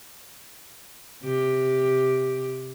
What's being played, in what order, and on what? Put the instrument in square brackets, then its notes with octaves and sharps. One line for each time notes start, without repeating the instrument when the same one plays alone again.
[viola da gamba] C3 G4